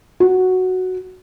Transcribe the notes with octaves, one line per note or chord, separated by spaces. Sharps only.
F#4